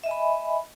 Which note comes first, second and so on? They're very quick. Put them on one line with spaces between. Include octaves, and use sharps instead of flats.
E5 D#5 G#5 B5